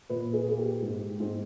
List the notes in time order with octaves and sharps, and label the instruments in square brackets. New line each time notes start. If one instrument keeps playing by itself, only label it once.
[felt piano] A#2 B4
G#4
A#3 G#4
G4
G#2
G#2